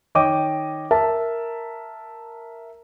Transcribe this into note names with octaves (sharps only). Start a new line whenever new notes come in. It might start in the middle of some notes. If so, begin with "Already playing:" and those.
D#3 C#5 D#5 G5 D6 D#7
A#4 E5 A5